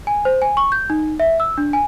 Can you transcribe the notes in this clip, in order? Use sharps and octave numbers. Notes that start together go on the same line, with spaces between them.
G#5
C5
G#5
C#6
G6
D#4
E5
E6
D4
G#5